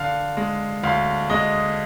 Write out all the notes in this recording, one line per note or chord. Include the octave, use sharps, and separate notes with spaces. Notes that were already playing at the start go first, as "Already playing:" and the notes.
Already playing: D3 F5
G#3
D2 F5
G#3 D#5